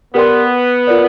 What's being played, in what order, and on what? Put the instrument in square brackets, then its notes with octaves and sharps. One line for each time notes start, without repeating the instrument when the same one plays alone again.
[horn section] B3 [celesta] G4 A#4 D5 G5 C6
[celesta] F4 A#4 D5